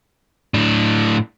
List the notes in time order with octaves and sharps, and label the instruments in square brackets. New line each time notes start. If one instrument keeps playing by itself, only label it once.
[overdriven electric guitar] A2 D4